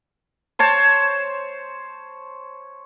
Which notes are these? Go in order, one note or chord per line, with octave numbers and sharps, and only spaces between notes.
C5 C#5 A5